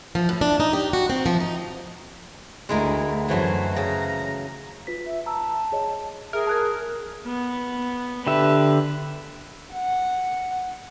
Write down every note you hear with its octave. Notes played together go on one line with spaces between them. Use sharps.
F3
A2
D4
D#4
G4
F#4
C4
F3
D#4
D2 G#3 E4 A#4
F#2 E3 F#3 A3 C5
C#3 A#5
F4 B4 B6
E5
A5 A#5 E6
G#4 C#5 D#5
G#4 A#4 E5
A5 F#6 G#6
B3
D3 G4 B4 E5
F#5